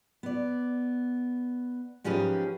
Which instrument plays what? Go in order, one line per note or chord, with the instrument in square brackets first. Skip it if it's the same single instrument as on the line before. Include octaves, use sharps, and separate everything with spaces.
[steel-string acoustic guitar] B3 D5
G#2 F3 C#4 G4 G#4 B4